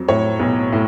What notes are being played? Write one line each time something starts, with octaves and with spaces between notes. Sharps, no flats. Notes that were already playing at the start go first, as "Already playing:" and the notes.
Already playing: F2 F#3
A2 C#5
B1
A2